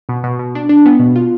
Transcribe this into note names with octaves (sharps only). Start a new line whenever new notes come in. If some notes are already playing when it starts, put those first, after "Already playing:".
B2
B2
B2
D4
D4
B3
B2
F4